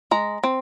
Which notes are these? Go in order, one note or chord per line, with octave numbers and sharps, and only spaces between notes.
G#3 A#5
C4